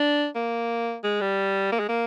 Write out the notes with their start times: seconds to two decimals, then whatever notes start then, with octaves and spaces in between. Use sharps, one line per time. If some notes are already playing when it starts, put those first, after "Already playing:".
Already playing: D4
0.35 A#3
1.04 G#3
1.21 G3
1.72 A#3
1.80 G#3
1.89 A#3